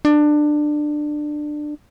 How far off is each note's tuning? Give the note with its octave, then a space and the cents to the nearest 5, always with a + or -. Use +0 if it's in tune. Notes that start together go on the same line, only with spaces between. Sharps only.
D4 +20